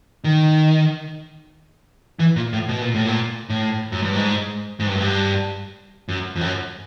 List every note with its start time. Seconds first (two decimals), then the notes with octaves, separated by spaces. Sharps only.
0.24 D#3
2.19 E3
2.36 A#2
2.53 A2
2.68 B2
2.81 A#2
2.95 A2
3.07 A#2
3.49 A2
3.92 F#2
4.02 G2
4.14 G#2
4.79 G#2
4.86 G2
4.94 F#2
5.00 G2
6.08 F#2
6.35 F2
6.41 F#2